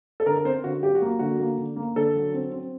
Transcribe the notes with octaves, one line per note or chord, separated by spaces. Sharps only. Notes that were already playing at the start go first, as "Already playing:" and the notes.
A4
D3 A#4
A#4
C4 C5
D3 F#4
F#3 G4
F#4
A#3
D3 F#4
A#3
D3
A#3
D3 A4
F#3
C4
C4